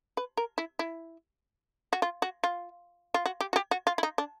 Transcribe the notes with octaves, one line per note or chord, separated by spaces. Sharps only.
B4
A#4
E4
E4
F#4
F4
F#4
F4
F4
F#4
G4
F#4
G4
F#4
F4
E4
D#4
D4